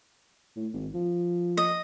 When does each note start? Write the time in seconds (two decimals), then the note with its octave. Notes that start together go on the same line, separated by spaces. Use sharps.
0.56 A2
0.73 G#1
0.94 F3
1.57 D#5